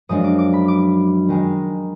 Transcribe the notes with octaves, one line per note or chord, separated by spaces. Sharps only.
F#2 F3 G#3 D4 D#6
D6
D6
B5
D6
D#3 G#3 D#4